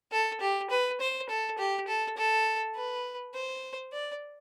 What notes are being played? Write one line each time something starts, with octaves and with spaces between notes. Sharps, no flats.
A4
G4
B4
C5
A4
G4
A4
A4
B4
C5
D5